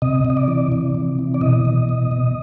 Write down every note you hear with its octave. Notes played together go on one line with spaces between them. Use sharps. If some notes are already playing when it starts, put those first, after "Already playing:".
C3 D#5
C3
D#5
D5
E3
C3
C3
E3
D5
B2 D#5
B2
B2
B2